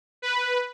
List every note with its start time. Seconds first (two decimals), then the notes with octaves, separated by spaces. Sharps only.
0.22 B4